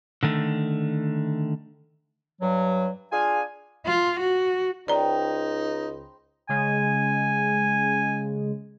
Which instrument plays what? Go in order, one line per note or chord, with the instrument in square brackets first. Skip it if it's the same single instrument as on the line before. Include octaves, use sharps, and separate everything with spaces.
[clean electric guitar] D3 D#3 A3
[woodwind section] G2 F#3
D4 F4 G#4 F5 G#5
[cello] F4
F#4
[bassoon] C#2 [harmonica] D#4 [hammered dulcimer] C5 G5 B5 [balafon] D5 A#5
[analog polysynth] C#3 G#3 [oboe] G#5